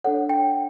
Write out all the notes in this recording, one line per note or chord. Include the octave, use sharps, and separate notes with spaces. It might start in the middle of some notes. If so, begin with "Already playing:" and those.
D4 A4 C#5 F#5
G5